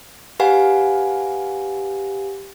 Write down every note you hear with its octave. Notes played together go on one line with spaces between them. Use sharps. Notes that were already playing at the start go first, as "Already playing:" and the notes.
G4 B4 F5 F#5 G#5